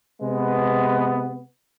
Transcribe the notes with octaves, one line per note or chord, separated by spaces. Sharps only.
C3 G#3 B3